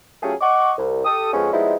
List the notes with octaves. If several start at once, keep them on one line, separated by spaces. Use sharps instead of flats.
F#3 A3 C#4 F4 G4 G#4
D#5 F#5 C#6 D6
C2
G4 A4 D#6
F2 F3 G#3 B3 C#4
F3 G3 G#3 B3 D#4 E4